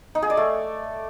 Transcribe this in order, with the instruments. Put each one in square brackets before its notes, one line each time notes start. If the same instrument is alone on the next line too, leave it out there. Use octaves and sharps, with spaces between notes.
[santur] D#4
G#4
D5
A3